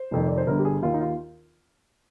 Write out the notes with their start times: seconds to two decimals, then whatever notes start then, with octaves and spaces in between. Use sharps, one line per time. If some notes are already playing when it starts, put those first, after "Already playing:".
Already playing: C5
0.11 F1 F2 D#3
0.27 D5
0.37 C5
0.47 G1 G2 D3 A#4
0.59 G4
0.65 G#4
0.82 D#2 D#3 F4
0.94 D#4
1.00 F4